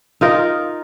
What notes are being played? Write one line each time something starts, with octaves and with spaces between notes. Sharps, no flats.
D#4 F4 A#4